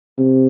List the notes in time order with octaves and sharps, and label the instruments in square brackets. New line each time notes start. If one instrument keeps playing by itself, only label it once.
[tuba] C3